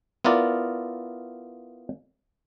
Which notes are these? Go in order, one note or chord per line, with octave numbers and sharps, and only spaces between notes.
B3 E4 F4 A#4 D5